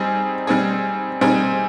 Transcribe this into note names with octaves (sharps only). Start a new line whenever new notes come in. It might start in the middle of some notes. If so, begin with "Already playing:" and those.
Already playing: G3 C4 D#4 G#4
G3 C4 D#4 G#4
G3 C4 D#4 G#4